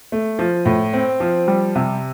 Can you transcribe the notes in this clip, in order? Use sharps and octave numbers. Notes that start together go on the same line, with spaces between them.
A3
F3
A2
C4
F3
G3
C3